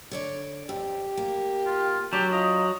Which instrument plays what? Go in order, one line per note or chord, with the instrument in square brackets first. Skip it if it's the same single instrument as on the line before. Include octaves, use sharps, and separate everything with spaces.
[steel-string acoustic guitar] D3 C#5 D5
[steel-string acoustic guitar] F2 [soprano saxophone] G4
[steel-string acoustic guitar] A#3
[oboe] F4
[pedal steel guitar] F#3 [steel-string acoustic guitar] D4 [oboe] G4 [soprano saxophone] A5
[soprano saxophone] F4 [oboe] D#5